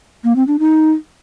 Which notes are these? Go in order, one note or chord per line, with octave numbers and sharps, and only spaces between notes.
A#3
C4
D4
D#4